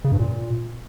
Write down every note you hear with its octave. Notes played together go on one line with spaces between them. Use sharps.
C#3
G2
A#2